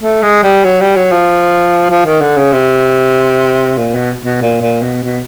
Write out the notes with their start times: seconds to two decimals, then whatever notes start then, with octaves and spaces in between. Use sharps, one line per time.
0.02 A3
0.23 G#3
0.43 G3
0.65 F#3
0.81 G3
0.96 F#3
1.12 F3
1.90 F3
2.05 D#3
2.21 D3
2.37 C#3
2.53 C3
3.78 A#2
3.95 B2
4.25 B2
4.41 A#2
4.61 A#2
4.82 B2
5.03 B2